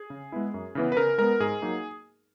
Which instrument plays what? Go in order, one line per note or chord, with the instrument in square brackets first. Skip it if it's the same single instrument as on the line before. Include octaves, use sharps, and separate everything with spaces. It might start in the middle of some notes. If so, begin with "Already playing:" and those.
Already playing: [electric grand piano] G#4
C#3
G#3 B3 E4
F#2
C#3 E3 B3
B4
C#3 A#4
G#3 B3 A#4
G#2 G#4
F#3 A#3 D#4